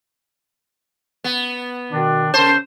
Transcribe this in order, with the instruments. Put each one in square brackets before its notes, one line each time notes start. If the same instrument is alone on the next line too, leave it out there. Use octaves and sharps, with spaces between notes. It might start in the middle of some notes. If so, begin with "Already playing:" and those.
[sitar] B3
[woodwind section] B2 D#3 D4
[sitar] C#3 C5 [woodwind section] A#4 A5 C6